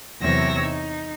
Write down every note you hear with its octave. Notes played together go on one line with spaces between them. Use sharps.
E2 C3 F#3 C#5 E6 A#6
D#4